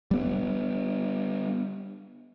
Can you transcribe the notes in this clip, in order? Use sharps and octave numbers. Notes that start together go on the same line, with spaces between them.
G3 B3